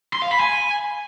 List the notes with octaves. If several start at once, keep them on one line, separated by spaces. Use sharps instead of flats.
C6
F5
B5
G#5